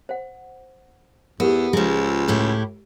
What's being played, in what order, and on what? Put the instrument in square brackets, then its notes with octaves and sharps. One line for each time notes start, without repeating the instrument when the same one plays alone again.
[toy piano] C5 F#5
[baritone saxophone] E2 [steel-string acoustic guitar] B3 [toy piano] G4 A4 A#4
[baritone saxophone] C#2 [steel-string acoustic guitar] F3 G#3 [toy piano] E4
[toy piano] E6
[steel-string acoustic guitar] A2 E4 G4